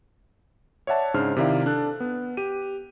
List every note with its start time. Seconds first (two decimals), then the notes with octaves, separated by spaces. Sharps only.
0.87 C#5 D5 E5 F#5 A5
1.14 G#2 C#3 D4 C5 F6
1.36 C3 D#3 E4 D5 F5
1.66 D4 A4 F#6
2.00 B3
2.37 G4 D#7